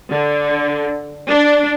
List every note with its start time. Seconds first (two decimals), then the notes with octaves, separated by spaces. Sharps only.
0.10 D3
1.29 D4